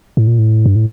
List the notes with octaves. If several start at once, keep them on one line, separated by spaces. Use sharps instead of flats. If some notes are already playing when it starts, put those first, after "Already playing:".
A2
A#2
A2
G2
A2